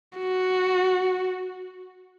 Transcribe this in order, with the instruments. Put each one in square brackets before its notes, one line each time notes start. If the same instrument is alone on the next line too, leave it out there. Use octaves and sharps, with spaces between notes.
[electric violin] F#4